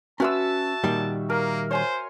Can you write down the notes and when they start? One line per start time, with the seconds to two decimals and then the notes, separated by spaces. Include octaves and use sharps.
0.20 C#4 F#4 B4 E5 A5 C6 E6
0.84 A#2 D#3 G3
1.30 A#3 A#4
1.71 C5 C#5 G#5 C6